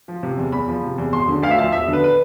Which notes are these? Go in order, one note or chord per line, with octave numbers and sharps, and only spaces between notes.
F3
C3
E2
E2 B5
F3
C3
E2
E1 C6
D3
D2 F5
E5
F3 F5
E1 E5
D3
B4
B4